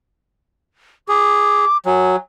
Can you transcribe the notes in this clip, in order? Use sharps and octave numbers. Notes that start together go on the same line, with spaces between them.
G#4 D6
F#3 G#5